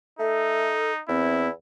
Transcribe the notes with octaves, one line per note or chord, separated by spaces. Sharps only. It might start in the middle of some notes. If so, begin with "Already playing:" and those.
A3 D#4 A4
E2 C4 E4